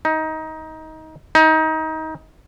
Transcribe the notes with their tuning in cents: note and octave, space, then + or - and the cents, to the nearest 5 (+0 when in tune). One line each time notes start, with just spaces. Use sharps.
D#4 +20
D#4 +25